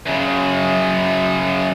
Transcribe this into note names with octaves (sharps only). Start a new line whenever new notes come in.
F#2 C#3